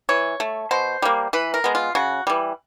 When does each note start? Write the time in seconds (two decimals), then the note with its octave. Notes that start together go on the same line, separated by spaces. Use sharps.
0.09 E3 C#5
0.40 A3
0.71 B2 C5
1.02 G3 A#3
1.33 E3 B4
1.54 A#4
1.64 G#3 B3
1.75 F4
1.95 C#3 F#4
2.27 E3 G3